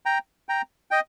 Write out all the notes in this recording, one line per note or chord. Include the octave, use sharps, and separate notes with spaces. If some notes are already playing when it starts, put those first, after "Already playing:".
G5 A#5
G5 A#5
D#5 G5